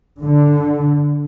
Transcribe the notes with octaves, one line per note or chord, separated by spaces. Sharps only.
D3